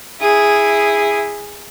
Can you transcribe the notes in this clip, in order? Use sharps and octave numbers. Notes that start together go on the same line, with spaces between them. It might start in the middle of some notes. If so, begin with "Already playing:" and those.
E4 G#4